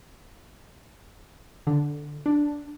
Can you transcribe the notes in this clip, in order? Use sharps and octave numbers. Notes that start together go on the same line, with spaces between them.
D3
D4